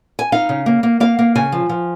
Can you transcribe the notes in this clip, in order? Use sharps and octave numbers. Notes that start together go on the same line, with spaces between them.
G#5
D#4 F5
C#3
A#3
A#3
A#3 F5
A#3
C#3 G#5
F3
F3